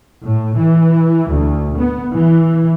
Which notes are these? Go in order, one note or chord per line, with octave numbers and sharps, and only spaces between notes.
A2
E3
D2
B3
E3